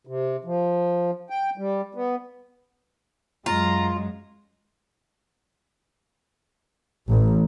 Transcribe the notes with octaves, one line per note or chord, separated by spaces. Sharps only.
C3
F3
G5
G3
B3
F#2 G#3 F4 A#5
A1